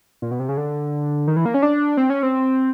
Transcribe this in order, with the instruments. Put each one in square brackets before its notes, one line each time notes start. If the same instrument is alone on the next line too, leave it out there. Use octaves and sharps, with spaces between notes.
[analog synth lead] A#2
B2
C3
C#3
D3
D#3
E3
A#3
C#4
D4
C4
C#4
C4